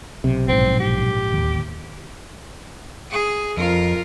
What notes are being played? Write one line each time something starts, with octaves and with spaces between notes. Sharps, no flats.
B1 C3
A#1 G#2 C4
G4
D1 D#2
G#4
F2 F4 A#4